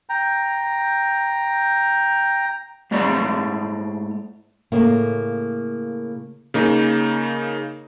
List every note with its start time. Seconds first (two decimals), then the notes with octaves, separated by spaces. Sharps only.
0.09 G5 A#5
2.91 G#2 A3 C#5 D5
4.72 A2 C#3 A#3
6.54 C#3 A#3 D#4